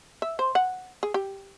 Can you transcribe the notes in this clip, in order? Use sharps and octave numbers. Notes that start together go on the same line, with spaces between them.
E5
C5
F#5
G#4
G4